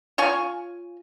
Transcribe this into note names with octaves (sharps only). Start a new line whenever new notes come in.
F4 C#5 G#5